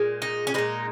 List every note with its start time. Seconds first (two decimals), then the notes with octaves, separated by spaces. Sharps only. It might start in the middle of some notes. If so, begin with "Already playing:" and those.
Already playing: A#2 G#3
0.22 D#4
0.47 C#4
0.54 A#2 G#3 D#4